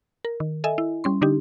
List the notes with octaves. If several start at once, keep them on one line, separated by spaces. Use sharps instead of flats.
A#4
D#3
A4 D#5 E5 G#5
E4
G3 C#4 C6
D3 D4 D#4 G4